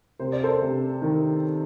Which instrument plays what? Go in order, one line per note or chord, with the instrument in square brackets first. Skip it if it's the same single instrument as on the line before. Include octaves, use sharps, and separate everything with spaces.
[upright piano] C3 C5
D5
A4 C5
C3
D#3